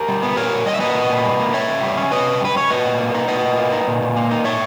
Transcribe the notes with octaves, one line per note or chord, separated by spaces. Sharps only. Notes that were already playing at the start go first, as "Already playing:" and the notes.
Already playing: G4 A#4
G3
B3
A#2 A#4 C#5
A#2
G3 D#5
E5
A#3 B4 D#5
A#2
A#2
G3
A#3
C#3 C#5 E5
C#3
G3
C#4
C#3 B4 D#5
C#3
G3 B4
C#4 C#5
A#2 B4 D#5
A#2
A#3
D#4
A#2 B4 D#5
A#2
A#3
D#4
A#2
A#2
A#3
D#4
A#2 C#5 E5